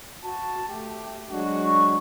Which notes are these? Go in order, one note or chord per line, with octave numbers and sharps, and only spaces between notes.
F#4 A5
A3 G4
F#3 G#3 D4 F#4
C#6